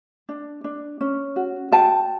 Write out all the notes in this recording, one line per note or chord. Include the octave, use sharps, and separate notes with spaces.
D4
D4
C#4
F#4
F#4 G5 A5